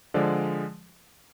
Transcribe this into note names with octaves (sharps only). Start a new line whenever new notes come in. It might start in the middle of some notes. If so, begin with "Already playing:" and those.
D3 F3 G#3 D5